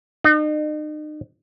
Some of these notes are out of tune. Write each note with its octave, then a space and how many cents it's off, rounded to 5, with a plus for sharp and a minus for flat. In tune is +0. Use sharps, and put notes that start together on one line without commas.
D#4 -40